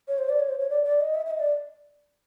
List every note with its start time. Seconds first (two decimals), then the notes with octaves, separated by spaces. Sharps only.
0.08 C#5
0.18 C5
0.29 D5
0.39 C#5
0.49 C5
0.59 C#5
0.70 D5
0.84 D5
1.00 D#5
1.15 E5
1.26 E5
1.30 D#5
1.40 D5